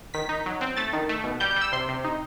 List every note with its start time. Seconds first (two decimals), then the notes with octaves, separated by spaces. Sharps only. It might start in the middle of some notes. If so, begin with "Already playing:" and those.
0.14 D#3 B6
0.29 D#4
0.46 F#3
0.61 C4
0.77 A3 A6
0.93 D#3
1.09 A3
1.24 B2
1.40 G3 G6
1.51 G6
1.56 G3
1.61 E6
1.72 C3 C6
1.88 C3
2.04 D#4